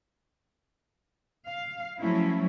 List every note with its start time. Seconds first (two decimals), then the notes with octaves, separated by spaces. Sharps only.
1.46 F5
1.98 F3 F#3 A3 C#4 E4